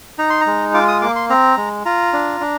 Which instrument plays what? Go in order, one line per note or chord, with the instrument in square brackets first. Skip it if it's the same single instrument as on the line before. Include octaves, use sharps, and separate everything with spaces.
[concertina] D#4 A#5
C6
A#5
G#3
F4 D6
D#6
A#3 D6
C6
C4 A#5
G#3
F4 A#5
D4
D4